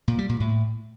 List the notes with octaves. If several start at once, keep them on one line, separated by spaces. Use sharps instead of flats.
A#2
G3
A#2
A2